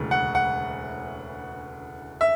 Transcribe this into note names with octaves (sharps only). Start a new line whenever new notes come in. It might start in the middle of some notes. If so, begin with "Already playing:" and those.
Already playing: E1 D2 C#3 E3
F#5
F#5
E5